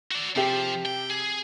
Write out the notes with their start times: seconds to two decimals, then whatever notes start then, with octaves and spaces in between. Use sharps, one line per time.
0.11 F#4 D5
0.36 C3 F3 G4
0.85 G5
1.10 G#4